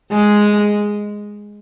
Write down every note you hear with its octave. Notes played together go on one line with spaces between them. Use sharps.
G#3